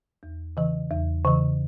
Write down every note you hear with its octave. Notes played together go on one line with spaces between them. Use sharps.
E2
C#3 E3
E2
C#3 E3